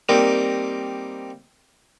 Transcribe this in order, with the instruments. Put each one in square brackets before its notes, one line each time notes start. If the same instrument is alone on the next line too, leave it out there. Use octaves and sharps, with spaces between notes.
[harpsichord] G3 A#3 C4 D#4